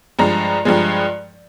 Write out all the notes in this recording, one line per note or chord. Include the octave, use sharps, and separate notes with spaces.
G2 F3 G#3 A#5
G2 F3 G#3